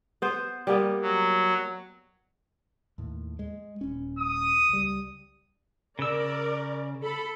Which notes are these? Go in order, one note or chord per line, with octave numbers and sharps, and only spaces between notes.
B3 C5
G3 A#3 B3
F#3
D#2 A2
G#3
D#1 C#4
D#6
C#2 G3
C#3 A#4 D5 E6
A4 B5